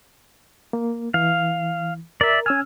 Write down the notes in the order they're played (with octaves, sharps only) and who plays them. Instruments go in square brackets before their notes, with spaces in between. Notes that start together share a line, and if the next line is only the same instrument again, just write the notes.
[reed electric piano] A#3
[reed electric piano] E3 [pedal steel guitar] F5
[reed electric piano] A#4 [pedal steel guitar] D5 E5
[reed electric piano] C#4 E6 F6 [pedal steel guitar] G#5